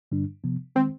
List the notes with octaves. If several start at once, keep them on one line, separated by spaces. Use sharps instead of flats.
G2 D3 G3 D4
C3 F3 B3
D#3 G#3 C4